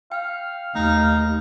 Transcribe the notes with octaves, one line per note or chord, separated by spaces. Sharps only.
F5 G5 F6
D#2 A3 D#4